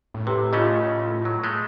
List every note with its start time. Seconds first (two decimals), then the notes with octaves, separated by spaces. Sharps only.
0.14 A2
0.27 C3 G4 A4 B4
0.53 C#3 A3 C#4 F4 D#5
1.25 F#3
1.44 G#3 A3